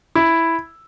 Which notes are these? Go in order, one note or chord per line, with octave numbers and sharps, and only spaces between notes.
E4